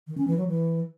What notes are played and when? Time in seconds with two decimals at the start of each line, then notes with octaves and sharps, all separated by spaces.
0.08 D#3
0.18 C#4
0.28 E3
0.38 F#3
0.48 E3